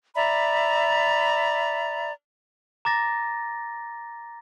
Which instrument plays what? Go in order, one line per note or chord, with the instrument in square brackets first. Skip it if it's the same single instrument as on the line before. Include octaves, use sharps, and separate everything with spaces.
[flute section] D5 E5 A#5 B5
[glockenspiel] A#5 D6 A6 A#6